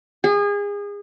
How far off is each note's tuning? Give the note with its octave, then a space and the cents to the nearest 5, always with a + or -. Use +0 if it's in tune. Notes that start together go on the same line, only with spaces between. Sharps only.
G#4 -30